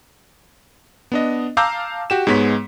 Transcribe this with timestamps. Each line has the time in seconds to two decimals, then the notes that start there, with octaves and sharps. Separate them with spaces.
1.12 B3 D4 D#5
1.57 F5 A5 A#5 D6 E6 G6
2.10 F#4 G4 E7
2.27 G#2 G#3 B3 C#5 B6